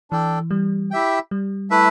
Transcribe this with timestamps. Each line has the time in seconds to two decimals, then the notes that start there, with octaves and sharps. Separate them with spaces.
0.11 E3 D4 A4 D5 G5
0.51 G3
0.91 E4 G4 E5 G5
1.31 G3
1.70 A3 E4 B4 E5